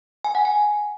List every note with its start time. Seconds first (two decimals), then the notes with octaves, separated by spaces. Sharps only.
0.24 G#5
0.35 F#5
0.45 G#5